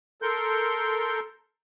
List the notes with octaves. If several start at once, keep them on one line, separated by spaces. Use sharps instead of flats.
A4 A#4 C6 G6